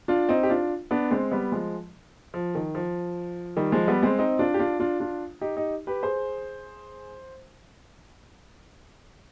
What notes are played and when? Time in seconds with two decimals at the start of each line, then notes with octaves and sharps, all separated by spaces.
0.08 D4 F4
0.29 C4 D#4
0.43 G4
0.50 D4 F4
0.91 B3 D4
1.11 G#3 C4
1.31 G3 B3
1.52 F3 G#3
2.34 F3
2.55 D#3
2.75 F3
3.57 D#3 G3
3.72 F3 G#3
3.88 G3 B3
4.03 G#3 C4
4.19 C4 D#4
4.39 D4 F4
4.54 G4
4.59 D4 F4
4.80 D4 F4
5.00 D4 F4
5.41 D#4 G4
5.57 D#4 G4
5.87 G4 B4
6.03 G#4 C5